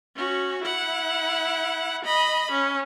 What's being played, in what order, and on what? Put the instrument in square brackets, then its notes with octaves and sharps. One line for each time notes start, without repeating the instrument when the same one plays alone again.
[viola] C#4 F#4
E4 F#5
D#5 B5
C#4